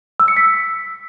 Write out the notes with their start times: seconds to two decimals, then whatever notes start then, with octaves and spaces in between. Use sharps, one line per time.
0.20 E6
0.28 C#7
0.37 B6